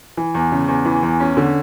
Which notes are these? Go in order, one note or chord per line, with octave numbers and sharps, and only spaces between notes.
E3
E2
C#3
E2
E3
E2
C#4
D3